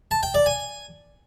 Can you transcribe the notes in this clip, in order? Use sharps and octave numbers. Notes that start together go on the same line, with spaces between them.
A5
G5
D5
G#5